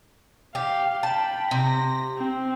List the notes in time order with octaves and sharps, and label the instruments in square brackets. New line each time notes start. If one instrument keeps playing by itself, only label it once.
[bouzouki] G4 [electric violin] F5
[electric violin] G5 B5 [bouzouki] A5
[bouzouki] C3 [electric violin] A#6
[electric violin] C4